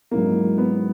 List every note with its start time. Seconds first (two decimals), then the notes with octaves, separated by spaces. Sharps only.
0.11 G#2 F#3 A#3 C#4 E4
0.58 B3